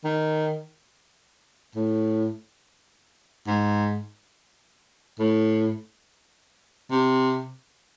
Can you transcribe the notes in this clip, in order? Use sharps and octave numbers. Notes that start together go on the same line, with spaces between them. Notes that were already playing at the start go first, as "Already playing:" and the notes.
D#3
A2
G#2
A2
C3